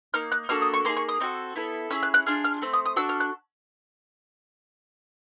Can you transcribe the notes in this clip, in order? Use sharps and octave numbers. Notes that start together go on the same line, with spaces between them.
A#3 D#4 F6
F#6
A#3 D4 F#4 A4 F6
D#6
C#6
A#3 D#4 G#4 C6
C#6
D#6
C4 D#4 F#4 A4
B3 E4 A4
C#4 E4 G#4 E6
F#6
F#6
D4 F4 G#4 F6
F6
A3 C4
D#6
D#6
D4 F#4 A4 E6
F6
F#6